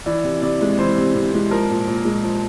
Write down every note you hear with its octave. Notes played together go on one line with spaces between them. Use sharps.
E3 D5
C3
C3 D5
G#3
E3 C5
C3
C3
G#3
F3 A#4
A#2
A#2
G#3
F3